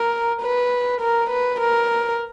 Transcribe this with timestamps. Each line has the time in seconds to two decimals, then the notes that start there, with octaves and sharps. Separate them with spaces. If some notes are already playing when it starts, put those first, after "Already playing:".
Already playing: A#4
0.42 B4
1.01 A#4
1.31 B4
1.60 A#4